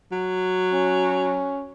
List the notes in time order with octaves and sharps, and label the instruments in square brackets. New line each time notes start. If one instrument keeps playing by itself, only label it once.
[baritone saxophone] F#3
[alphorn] C#4